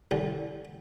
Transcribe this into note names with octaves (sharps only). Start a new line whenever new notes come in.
C2 D3